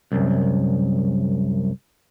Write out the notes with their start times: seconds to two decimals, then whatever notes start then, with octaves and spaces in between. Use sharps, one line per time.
0.12 C2 F#2